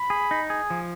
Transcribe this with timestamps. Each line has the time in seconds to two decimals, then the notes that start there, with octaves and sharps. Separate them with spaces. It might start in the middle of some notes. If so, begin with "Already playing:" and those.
Already playing: B5
0.10 G#4
0.31 D#4
0.50 G#4
0.70 F3